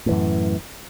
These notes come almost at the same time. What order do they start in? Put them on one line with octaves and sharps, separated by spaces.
A2 E3 F#2